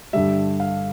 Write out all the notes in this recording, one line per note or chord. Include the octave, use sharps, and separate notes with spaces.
G2 D3 G3 E5
F5